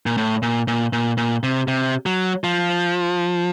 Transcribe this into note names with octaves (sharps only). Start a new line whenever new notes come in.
A#2
A2
A#2
A#2
A#2
A#2
C3
C3
F#3
F3